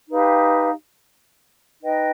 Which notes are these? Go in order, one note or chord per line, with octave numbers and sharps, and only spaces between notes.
D#4 G4 B4 F5
D#4 B4 D#5 G5